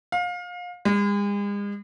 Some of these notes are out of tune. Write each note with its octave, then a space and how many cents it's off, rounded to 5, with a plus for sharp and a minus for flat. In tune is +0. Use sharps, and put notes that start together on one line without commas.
F5 +30
G#3 -40